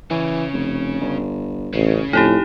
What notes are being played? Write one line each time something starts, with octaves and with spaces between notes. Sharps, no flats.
C#3 E3 C#4
F1
G1
A1 C#3
F2 A2 D#4 E4 G4